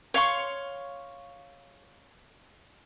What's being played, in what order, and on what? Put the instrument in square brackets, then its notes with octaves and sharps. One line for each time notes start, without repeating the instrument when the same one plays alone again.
[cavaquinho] C#5 F5 C6 C#6